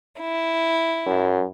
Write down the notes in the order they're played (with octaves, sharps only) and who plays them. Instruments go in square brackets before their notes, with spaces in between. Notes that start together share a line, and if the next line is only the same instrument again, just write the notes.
[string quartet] E4
[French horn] F#2